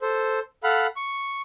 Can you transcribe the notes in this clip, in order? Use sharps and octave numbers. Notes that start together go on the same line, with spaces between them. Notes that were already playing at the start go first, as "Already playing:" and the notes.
A4 C5
A4 F5 F#5 B5
C#6